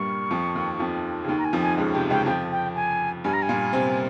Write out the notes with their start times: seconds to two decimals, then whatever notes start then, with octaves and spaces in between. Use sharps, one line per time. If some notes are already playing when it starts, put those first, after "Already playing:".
Already playing: G2 A#2 G3 A#3 C#6
0.31 F2 F3
0.55 D#2 D#3
0.79 F2 F3
1.24 C#3
1.28 D#2 D#3
1.39 A#5
1.45 G#5
1.53 F2 F3
1.62 G#5
1.77 C#2 C#3
1.93 C3 G5
2.10 C#2 C#3 G5
2.26 F2 F3 G5
2.51 G5
2.75 G#5
3.24 G2 G3 G#5
3.33 A#5
3.42 G#5
3.49 A#2 A#3
3.73 C3 C4